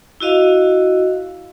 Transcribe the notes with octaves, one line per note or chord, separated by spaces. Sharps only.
E4 F#4 D#5 F5